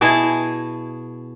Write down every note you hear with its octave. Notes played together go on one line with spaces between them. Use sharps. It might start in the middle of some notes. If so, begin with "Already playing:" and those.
B2 E4 G#4 A5